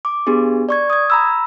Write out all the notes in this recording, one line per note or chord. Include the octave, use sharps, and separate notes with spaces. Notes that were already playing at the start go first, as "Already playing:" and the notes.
D6
B3 D4 G4 G#4
D5 C#6 G#6
D#6 G#6
A#5 B5 E6